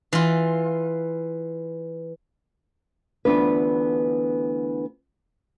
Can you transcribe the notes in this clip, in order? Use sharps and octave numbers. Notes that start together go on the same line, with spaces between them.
E3 F4
D2 E3 B3 D4 F4 B4